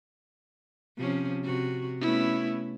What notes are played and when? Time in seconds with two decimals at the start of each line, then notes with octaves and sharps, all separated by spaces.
0.98 C3 F3 C#4
1.44 C3 F#4
2.01 A3 B3 C#4 E4